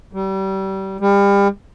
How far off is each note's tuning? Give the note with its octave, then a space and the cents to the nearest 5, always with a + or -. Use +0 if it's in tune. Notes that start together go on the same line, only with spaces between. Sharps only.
G3 -30
G3 +35